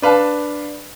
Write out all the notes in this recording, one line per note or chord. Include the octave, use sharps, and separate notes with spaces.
D4 B4 F5 A5